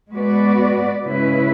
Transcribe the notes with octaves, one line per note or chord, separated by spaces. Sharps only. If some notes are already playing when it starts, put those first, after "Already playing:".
G#3 B3 F#4 B4 D5
C#3 G#3 C#4 E4 B4